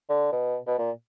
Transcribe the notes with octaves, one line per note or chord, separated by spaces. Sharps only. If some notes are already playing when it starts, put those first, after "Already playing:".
D3
B2
B2
A#2